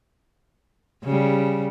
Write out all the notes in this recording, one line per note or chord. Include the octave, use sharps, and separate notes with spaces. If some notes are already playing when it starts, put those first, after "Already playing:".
C#3 G3